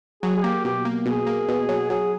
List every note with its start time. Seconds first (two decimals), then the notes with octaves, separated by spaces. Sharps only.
0.23 F#3 G#4
0.36 G#4
0.43 A#3 G4
0.65 B2 G4
0.85 A#3
1.06 B2 G#4
1.27 A#3
1.48 B2
1.69 F#3
1.90 F#3 G#4